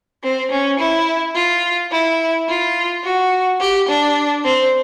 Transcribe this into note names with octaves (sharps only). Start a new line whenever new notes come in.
C4
C#4
E4
F4
E4
F4
F#4
G4
D4
C4